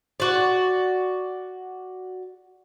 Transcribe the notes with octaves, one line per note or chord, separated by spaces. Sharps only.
F#4 D5